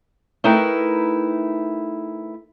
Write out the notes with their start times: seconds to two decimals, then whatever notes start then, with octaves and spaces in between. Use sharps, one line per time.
0.44 A3 D#4 E4 A#4 B4 G5